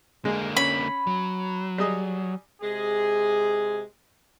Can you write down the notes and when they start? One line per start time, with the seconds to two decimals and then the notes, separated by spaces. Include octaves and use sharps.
0.25 D3 G#3 A#3
0.57 C#4 B5
1.07 F#3
1.78 G3 G#4 D#5
2.62 C3 G#3 G#4